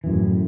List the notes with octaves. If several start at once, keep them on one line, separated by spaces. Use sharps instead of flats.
F#2 A2 E3